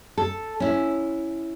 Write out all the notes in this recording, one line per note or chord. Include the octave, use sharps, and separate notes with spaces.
A4
C#4 E4